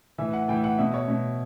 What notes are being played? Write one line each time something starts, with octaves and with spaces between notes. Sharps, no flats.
A2 E3 E5
F#5
A2 E3 G5
F#5
B2 E5
C#5
B2